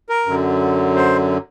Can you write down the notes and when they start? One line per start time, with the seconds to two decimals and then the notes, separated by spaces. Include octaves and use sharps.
0.09 A#4
0.26 F#2 D3 F#3
0.96 C5